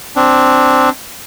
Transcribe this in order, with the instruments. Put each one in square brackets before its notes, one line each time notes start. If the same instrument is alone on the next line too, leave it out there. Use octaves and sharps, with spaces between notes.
[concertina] C4 D4